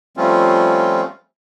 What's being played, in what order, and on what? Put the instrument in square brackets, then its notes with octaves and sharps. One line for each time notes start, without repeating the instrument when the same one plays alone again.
[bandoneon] F3 G3 A3 C4 C#4 F4